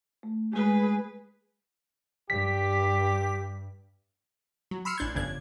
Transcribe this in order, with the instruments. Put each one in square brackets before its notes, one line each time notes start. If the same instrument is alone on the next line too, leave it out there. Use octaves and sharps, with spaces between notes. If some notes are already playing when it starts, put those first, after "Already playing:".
[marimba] A3
[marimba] G#3 [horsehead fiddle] G#4 B4
[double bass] G2 [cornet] G4 [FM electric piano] B6
[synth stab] F#3
B5 C6 E6 F6 C7 C#7
A1 D4 G6 G#6
G1 F2 C#3 D4 G#6